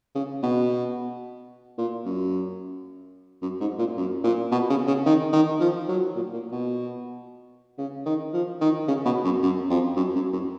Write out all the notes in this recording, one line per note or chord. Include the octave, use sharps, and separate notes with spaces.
C#3
B2
A#2
F#2
F#2
G#2
A#2
F#2
A#2
B2
C#3
C#3
D#3
D#3
F3
F#3
A#2
A#2
B2
C#3
D#3
F3
D#3
C#3
B2
F#2
F#2
F2
F#2
F#2
F#2